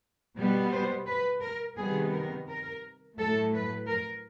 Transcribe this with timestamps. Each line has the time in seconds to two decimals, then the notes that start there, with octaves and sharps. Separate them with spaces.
0.36 B2 G3 B3
0.71 C5
1.06 B4
1.41 A#4
1.77 C3 D#3 G3 B3 G#4
2.12 A#4
2.48 A#4
3.18 A2 F#3 A3 A4
3.53 B4
3.88 A#4